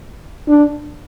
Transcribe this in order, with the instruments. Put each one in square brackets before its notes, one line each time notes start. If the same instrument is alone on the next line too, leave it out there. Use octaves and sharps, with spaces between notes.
[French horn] D4